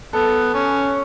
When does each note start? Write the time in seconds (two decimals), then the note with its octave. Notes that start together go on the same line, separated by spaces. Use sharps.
0.13 B3 A4
0.54 C#4